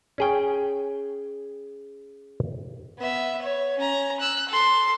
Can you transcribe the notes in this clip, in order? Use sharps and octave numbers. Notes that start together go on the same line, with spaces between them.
C#4 G#4 G5
B3 E5
C#5
C#4 A#5
E6 F#6
A4 C6